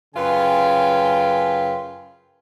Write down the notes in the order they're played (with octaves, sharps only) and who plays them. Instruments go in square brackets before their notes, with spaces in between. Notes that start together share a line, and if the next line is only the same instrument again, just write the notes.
[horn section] F#2 C#3 F4 B4 G5 G#5